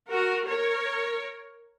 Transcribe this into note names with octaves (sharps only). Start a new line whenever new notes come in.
F#4 A#4
A#4 C#5